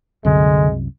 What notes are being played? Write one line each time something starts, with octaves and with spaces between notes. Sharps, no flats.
C2 F#2 D3 G#3